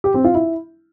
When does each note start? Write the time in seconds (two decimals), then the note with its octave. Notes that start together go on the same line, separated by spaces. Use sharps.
0.04 G4
0.14 C4
0.24 F4
0.35 E4